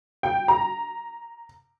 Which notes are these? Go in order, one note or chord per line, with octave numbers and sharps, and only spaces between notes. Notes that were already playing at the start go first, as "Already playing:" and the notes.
G5
A#5